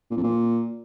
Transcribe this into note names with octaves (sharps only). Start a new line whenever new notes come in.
A#2
F2
A#2